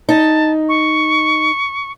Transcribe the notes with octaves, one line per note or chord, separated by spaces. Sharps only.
D#4 A5
C#6